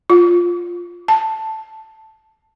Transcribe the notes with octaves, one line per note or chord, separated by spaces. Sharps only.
F4
A5